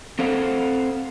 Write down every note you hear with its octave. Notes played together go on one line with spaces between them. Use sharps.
C4 A4 C5 F5 F#5